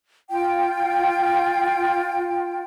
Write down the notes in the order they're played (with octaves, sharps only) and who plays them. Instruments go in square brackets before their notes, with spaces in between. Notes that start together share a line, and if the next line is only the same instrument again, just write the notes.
[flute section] F4 G5